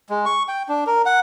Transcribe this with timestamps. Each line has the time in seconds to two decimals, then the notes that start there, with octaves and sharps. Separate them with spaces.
0.10 G#3
0.26 C#6
0.48 G5
0.69 D4
0.87 A#4
1.06 F#5